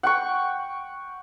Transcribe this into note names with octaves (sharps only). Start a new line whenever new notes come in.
F#5 G5 C#6